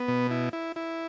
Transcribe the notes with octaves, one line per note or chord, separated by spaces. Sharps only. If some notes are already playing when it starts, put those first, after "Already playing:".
Already playing: B3
B2
E4
E4
E4